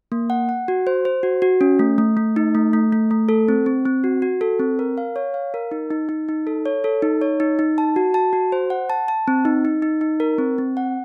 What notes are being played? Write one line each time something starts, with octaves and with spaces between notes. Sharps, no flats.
A#3
F#5
F#5
F#4
C5
C5
F#4
F#4
C#4
A3
A3
A3
D#4
A3
A3
A3
A3
A4
C4
C4
C4
F#4
F#4
A4
C4
A#4
F5
C#5
F5
A#4
D#4
D#4
D#4
D#4
A4
C#5
A4
D#4
C#5
D#4
D#4
A5
F#4
A5
F#4
C5
F#5
A5
A5
C4
D#4
D#4
D#4
D#4
A#4
C4
C4
F#5